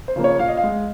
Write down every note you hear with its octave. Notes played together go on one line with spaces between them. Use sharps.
C5
C#3 F3 A#3
C#5
A#2 F5
D#5
F5
G#3